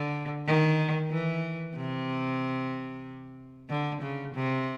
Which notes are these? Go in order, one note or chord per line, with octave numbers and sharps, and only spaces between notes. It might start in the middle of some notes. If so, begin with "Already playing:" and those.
Already playing: D3
D#3
E3
C3
D3
C#3
C3